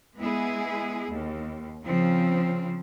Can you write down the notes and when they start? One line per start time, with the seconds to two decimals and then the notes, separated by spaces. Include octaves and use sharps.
0.18 G#3 B3 E4 G#4
1.10 D#2
1.85 C#3 F3 C4